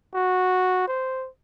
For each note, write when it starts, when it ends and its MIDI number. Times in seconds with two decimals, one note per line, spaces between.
0.15 0.87 66
0.88 1.28 72